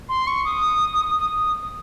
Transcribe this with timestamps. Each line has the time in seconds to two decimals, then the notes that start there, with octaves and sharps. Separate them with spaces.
0.09 C6
0.27 C#6
0.45 D#6
1.18 D#6